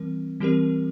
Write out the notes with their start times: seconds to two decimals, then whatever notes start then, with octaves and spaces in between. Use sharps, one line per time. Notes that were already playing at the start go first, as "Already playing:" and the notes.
Already playing: E3 G3 C4 A#4
0.40 E3 G3 C4 G4 A#4